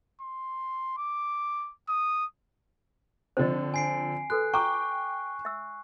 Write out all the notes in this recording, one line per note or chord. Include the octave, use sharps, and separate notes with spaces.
C6
D6
D#6
D3 F3 C4 C5 D#5
G#5 C7 D7
F#4 A4 B4 F#6
G5 A#5 C#6 D6
E5 E6